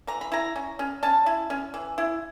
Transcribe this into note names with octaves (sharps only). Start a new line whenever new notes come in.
E3 A#5
B5
E4 A#5
C#4
C#4
C#4 A5
E4
C#4
E3
E4